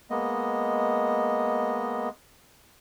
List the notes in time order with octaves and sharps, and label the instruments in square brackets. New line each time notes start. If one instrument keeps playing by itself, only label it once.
[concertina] G#3 A#3 B3 D#5